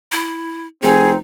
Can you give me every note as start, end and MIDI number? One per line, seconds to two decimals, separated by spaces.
0.12 0.67 64
0.83 1.15 29
0.83 1.17 60
0.83 1.18 63
0.83 1.10 68